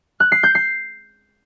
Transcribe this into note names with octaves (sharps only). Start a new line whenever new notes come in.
F#6
C7
G6
C7